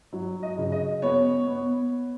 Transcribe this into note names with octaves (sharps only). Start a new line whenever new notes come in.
F#3
D#5
C#3
D#5
B3 C#5
B3